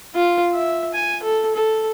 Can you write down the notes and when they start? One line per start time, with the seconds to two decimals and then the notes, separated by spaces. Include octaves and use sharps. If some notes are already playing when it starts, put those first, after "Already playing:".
0.15 F4
0.54 E5
0.94 G#5
1.23 A4
1.55 A4